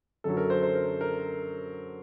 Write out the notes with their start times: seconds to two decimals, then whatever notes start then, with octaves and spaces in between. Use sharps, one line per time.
0.24 F#2 D3 F#3 A4
0.37 A#4
0.50 C5
0.63 C5
0.75 A#4
1.01 A#4